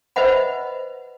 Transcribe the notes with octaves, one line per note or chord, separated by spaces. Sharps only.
B4 C5 D#5 E5 F#5 B5